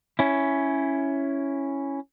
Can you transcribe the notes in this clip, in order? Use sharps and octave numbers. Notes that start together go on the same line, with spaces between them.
C#4 E4